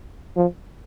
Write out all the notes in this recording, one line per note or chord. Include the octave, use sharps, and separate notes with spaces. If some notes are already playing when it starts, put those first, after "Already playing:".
F3